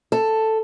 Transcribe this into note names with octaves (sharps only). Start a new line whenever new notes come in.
A4